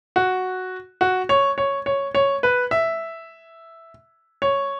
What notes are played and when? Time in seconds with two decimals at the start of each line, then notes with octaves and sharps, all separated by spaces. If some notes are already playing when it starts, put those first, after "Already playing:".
0.16 F#4
1.01 F#4
1.29 C#5
1.58 C#5
1.86 C#5
2.15 C#5
2.43 B4
2.71 E5
4.42 C#5